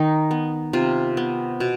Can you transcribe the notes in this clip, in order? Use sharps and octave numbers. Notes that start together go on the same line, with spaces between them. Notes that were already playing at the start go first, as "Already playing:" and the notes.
Already playing: D#3 D#4
B3
C3 F4
B3
B2